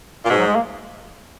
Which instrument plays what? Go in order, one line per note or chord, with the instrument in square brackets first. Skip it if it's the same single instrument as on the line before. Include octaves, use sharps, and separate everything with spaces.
[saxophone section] A#2
[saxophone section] G#2 [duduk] B2
[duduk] F#3
G#3
A#3